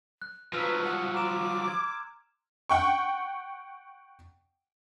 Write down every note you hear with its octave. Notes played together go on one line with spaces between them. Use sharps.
F#6
F3 F#3 B4 E6 F6 F7
F#5
A#5 C6 D6 E7
G#6
F#5 G5 C#6